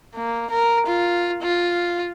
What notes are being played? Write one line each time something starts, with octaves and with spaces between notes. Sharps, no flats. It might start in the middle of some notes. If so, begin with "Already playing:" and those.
A#3
A#4
F4
F4